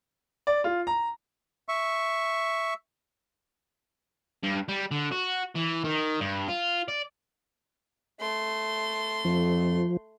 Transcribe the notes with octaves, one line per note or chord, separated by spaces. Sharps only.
D5
F4
A#5
E5 C#6
G2
G3
D3
F#4
E3
D#3
G2
F4
D5
A3 C6
F2 F3